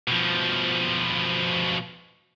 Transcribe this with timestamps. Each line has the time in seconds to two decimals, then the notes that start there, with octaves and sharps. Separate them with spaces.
0.08 B2 F3